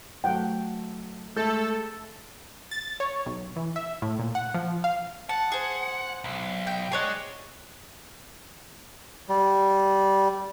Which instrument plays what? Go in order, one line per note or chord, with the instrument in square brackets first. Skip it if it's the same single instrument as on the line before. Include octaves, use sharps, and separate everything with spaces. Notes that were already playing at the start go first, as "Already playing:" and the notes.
[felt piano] F#3 A3 [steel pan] F#5 G5
[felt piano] G#3 G6 A6 [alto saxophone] A3 [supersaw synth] A4
[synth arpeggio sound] A6
C#5
B1
E3
E5
A2
A#2
F#5
F3
F5
[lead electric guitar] F#5 [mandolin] A5
[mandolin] G#4 C5
[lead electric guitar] B1
[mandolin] G5
[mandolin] D4 C#5 F#5 [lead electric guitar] G#4 D#5
[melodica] G3